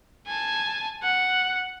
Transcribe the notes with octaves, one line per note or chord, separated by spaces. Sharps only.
G#5 A5
F#5